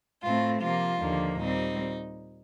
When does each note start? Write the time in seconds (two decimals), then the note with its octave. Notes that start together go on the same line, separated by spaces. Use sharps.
0.23 A2 A3 C4 F4
0.62 C3 F3 A#3 F4
1.00 D#2 D3 F3 A#3
1.40 A#2 G3 C4 D#4